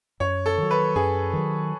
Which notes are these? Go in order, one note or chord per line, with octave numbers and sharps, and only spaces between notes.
F#2 C#5
A4
D#3 F#3
B4
F#2 G#4
D#3 F#3